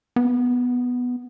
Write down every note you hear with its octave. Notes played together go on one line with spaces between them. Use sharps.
B3